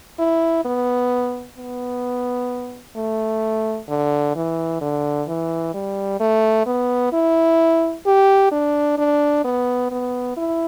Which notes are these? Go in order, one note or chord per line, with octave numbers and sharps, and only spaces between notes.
E4
B3
B3
A3
D3
E3
D3
E3
G3
A3
B3
E4
G4
D4
D4
B3
B3
E4